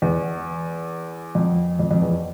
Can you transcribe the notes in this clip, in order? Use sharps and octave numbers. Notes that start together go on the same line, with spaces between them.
E2
F2
F2
F2
E2